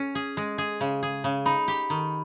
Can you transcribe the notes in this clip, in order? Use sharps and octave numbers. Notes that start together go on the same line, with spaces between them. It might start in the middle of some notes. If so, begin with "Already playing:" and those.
Already playing: C#4
G#4
G#3
G#4
C#3
G#4
C#3
D#4 B5
G4
D#3